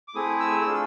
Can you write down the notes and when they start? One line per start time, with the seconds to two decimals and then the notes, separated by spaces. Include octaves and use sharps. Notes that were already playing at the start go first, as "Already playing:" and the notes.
0.08 D6
0.15 A3 C4 E4 G#4 D#6
0.40 E6
0.65 A3 D4 F4 A4